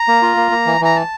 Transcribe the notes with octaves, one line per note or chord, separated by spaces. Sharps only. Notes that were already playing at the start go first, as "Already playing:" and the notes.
Already playing: A#5
A#3
F4
A#3
A#3
E3
E3 A#5
A5